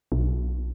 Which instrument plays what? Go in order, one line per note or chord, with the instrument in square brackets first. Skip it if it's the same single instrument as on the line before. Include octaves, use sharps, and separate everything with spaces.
[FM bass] B1